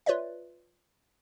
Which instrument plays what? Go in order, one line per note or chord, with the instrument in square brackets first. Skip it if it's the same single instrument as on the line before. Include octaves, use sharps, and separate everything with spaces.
[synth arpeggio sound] F4 B4 C#5 D5 E5